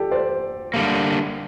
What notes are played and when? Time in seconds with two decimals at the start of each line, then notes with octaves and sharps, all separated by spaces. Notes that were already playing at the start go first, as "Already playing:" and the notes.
Already playing: G4 A4 D5
0.11 C5 D5
0.74 D3 G3 A#3